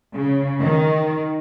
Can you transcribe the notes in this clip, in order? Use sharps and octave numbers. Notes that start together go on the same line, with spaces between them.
C#3
D#3